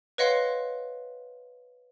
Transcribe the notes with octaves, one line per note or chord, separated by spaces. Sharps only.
B4 C#5 D#5 F5 F#5 C6